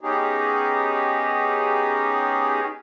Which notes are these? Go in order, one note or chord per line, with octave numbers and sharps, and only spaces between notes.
B3 C#4 D#4 G4 G#4